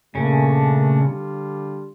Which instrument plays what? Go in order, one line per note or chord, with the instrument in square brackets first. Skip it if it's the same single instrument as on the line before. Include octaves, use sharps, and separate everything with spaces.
[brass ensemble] A#2 A3 D4 [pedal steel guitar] C#3 C#4
[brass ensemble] D3 G3 D4 F4